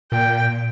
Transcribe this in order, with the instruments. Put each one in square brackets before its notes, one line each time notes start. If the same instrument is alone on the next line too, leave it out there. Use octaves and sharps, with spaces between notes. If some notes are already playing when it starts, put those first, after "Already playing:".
[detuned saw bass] A#2 [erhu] G5